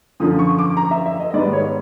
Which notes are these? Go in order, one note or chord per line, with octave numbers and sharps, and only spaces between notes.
F#2 D3 F3 D#6
C#6
D6
A#5
E5
E5
D#5
D#5
G#2 D#3 G3 B3 D5
C#5